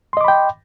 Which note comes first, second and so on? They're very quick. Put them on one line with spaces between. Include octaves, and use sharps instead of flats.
C6 D#5 D6 B5 G5